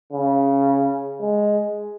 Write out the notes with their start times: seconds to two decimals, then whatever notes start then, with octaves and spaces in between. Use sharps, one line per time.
0.12 C#3
1.20 G#3